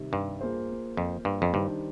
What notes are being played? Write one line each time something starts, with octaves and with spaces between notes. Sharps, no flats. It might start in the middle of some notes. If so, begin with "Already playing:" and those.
Already playing: C3 D#3 G3
G2
A#3 F4 G#4 C5
F2
G2
F2
G2 D#3 G3 D4 G4 C5